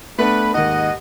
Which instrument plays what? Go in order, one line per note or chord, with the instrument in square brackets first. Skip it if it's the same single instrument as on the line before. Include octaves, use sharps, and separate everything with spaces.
[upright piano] A3 B3 D4 [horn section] B4
[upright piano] D#2 G#2 [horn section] D#5 F#5